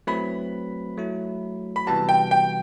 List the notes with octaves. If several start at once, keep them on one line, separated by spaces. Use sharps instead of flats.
F#3 A3 C4 E4 B4 B5
F#3 A3 E4
B5
C3 E3 G3 B3 F#4 A5
G5
G5